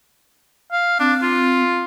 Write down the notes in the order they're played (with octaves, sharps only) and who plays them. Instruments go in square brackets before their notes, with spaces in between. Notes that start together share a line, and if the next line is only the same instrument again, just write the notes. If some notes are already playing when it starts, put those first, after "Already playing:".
[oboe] F5
[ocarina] C4 [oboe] D4
[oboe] F4